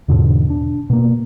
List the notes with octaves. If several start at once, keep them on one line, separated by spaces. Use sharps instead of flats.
E2 G#2 B2 D3
D4
B2 A#3